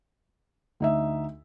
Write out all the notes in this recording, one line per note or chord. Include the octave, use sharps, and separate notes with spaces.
D2 D#4 E5